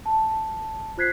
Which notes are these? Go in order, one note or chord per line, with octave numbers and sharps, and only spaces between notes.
A5
F4 C5 F#6 G#6 B6 C7